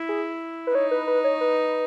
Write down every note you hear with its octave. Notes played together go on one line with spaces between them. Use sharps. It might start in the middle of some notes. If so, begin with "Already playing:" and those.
Already playing: E4
G#4
B4
D#4 C#5
B4
B4
C#5
B4